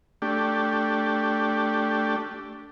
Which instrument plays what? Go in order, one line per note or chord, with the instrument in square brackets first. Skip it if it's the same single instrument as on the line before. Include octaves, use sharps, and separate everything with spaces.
[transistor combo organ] A3 D4 G4